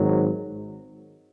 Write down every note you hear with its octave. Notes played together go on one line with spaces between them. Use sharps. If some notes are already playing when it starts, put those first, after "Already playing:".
Already playing: G#1 G#2 D#3 F#3